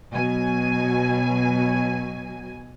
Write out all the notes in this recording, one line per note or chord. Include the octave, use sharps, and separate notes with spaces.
B2 F#3 G#5